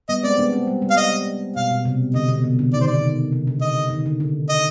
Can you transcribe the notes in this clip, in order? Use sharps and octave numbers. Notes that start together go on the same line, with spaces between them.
G3 B3 D#5
G#3 C4 D5
B3 D4
G#3 C4
G3
G3
F5
D#5
B2 F5
B2
C3
D3 D#5
B2
C3
D3
D#3 D5
D3 C5
D5
D#3
C3
C3
D3
D#5
D#3
D3
D3
D#5